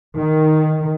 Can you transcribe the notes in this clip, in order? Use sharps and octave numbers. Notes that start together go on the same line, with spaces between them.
D#3